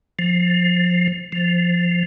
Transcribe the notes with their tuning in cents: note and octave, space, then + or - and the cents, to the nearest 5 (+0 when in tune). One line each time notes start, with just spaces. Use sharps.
F3 +20
F3 +0